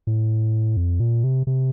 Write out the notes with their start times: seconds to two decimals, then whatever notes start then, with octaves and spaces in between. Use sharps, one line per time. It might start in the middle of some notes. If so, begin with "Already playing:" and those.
0.07 A2
0.77 F2
1.00 A#2
1.24 C3
1.47 C3